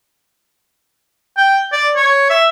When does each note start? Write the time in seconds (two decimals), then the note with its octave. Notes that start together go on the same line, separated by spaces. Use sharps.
1.37 G5
1.72 D5
1.96 C#5
2.30 E5